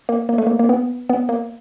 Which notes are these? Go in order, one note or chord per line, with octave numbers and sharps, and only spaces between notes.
A#3
A#3
A3
A#3
A#3
B3
B3
A#3